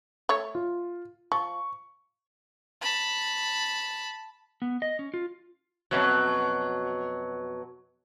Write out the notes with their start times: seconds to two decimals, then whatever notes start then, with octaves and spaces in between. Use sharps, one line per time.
0.29 A3 C#5
0.55 F4
1.32 F3 C#6
2.81 A5 B5
4.62 B3
4.82 D#5
4.99 C#4
5.14 F4
5.91 F2 B2 F#3